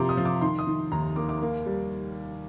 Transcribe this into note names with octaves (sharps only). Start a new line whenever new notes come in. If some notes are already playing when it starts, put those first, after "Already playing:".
Already playing: C3 F3 A#3 A#5 C6 D6
D#6
F3
D6
D#3 C6
D#6
D#3
D#2 A#5
A#3 D6
D6
A#3
G3